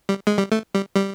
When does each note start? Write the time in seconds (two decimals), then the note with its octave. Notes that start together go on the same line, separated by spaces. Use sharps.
0.09 G3
0.27 G#3
0.38 G3
0.52 A3
0.75 G3
0.96 G3